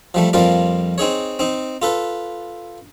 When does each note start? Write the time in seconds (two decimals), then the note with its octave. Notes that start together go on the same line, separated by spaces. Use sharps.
0.14 F3 G3 A3
0.33 F2 F3 G3 A#3 F4 D5
0.98 C4 D#4 G#4 C#5
1.39 C4 D#4
1.82 F4 A4 B4